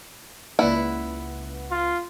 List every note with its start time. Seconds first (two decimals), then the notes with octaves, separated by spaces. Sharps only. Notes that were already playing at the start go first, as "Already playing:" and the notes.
0.59 C#2 A#3 E4 B4 D5 F#5
1.71 F4